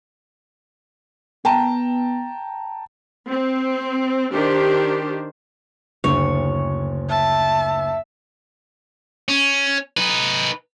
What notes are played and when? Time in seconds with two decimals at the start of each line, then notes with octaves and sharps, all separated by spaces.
1.45 B3 G5 A5 A#5
3.28 C4
4.33 D#3 D4 G4 C5
6.04 F#1 D2 C#5
7.09 E5 A5
9.28 C#4
9.97 D#4 B4